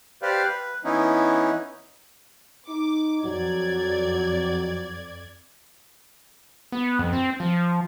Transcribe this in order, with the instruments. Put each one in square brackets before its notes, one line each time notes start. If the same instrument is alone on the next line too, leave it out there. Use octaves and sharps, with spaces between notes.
[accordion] G4 B4 C5 D5 F5
B4
E3 B3 C#4 D#4 E4
[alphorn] D#4 [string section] D6
[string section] F2 D5 G#6 [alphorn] F#3
[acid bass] B3
F2
C4
F3